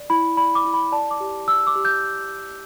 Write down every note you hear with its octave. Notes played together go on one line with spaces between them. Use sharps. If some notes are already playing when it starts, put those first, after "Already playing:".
Already playing: D5
E4 B5
D5 B5
D6
E4
B5
D5 A5
D6
G4
D5 E6
D6
G4
G6